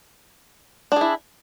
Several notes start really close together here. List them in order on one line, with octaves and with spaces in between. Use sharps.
D4 G#4 E4